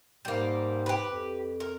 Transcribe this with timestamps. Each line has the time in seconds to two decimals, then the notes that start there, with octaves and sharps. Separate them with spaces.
0.25 G#2 G3 A#3
0.86 G4 B4
1.07 F2
1.60 A#4